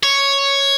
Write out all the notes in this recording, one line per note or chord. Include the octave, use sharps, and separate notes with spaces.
C#5